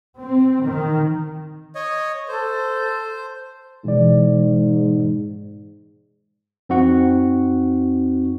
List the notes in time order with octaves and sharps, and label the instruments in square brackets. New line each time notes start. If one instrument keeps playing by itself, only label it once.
[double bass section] C4
D#3
[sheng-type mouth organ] C#5 D#5
[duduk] A4 [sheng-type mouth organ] C5
[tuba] G#2 [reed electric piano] B2 E3 D5
[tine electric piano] F2 C4 D#4 F#4 F#5 C#6